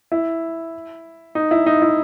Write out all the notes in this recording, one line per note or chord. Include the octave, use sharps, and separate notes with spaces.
E4
D#4
E4
D#4
E4